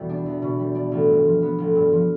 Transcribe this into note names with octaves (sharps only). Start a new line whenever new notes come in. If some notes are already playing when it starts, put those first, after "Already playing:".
Already playing: E2 B2 G3
D4
E2
B2
G3
D4
A1
G2
F3
B3
A1
G2
F3